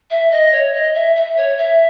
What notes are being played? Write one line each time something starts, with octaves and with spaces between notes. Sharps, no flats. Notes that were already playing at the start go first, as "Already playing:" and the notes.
E5
D#5
C#5
D#5
E5
E5
C#5
E5